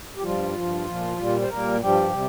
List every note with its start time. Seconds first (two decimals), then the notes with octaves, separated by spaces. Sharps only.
0.17 G4
0.23 G2 F3 G3 F4
0.55 G2 F3
0.87 A#2 F3
1.18 A#2 G3
1.42 C5
1.49 A#2 G3 A#3 A#4
1.80 G2 F3 G3 G4
2.12 C3 G3